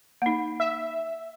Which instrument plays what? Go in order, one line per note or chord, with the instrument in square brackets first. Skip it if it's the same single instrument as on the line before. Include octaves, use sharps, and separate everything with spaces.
[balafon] A#3 D#4
[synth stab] E5